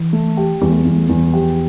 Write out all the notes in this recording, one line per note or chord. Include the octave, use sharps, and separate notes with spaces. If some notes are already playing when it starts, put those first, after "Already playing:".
Already playing: E3
A3
G4
E2 G3
A3
G3
E2
A3
E2
G3
F3 G4